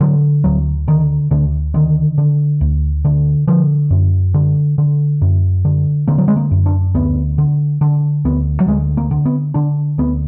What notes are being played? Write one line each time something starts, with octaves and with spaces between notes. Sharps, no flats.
D3 F#3
D2 F#3
D3 D#3
D2 D3
D3 D#3
D3
D2
D3
D3 F3
F#2
D3
D3
F#2
D3
D3 A#3
F#3
G#3
A#3
F#2
D4
D2 B3
D3
D3 D4
D2 B3
F#3
D2 G#3
A#3
D3
B3
D3 D4
D2 B3